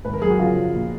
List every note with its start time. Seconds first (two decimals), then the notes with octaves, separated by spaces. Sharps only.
0.05 G#1 B4
0.13 A#4
0.22 F#2 G#4
0.30 F#4
0.39 C#3 F4
0.57 F3
0.74 A#1